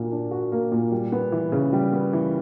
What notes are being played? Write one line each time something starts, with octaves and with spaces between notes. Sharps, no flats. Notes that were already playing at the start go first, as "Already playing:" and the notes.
Already playing: A#2 A#3 D4 F#4
D4
F#4
A#3
A#2
G3
B3
E3
C#3
G3
B3
E3